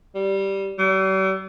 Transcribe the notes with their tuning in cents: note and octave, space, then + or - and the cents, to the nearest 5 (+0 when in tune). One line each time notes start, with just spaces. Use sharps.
G3 -5
G3 -45